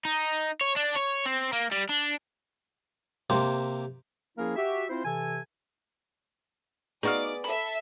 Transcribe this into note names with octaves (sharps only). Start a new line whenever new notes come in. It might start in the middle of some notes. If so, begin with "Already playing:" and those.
D#4
C#5
D4
C#5
C4
A#3
G3
D4
C3 A#3 G4 C5
F3 A#3 C#4 E4 G#4 A#4
F#4 G4 E5
C4 E4 F4 C5
C3 E3 A4 G#5
B3 D#4 F#4 G#4 D5 F5 D6
A4 E5 B5